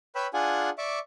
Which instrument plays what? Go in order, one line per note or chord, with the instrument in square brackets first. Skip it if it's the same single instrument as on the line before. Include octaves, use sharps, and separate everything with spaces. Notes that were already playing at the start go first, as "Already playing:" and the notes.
[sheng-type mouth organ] B4 C#5 G5 B5 E6
D4 F4 G#4 F#5 G#5
D5 E5 C#6 D6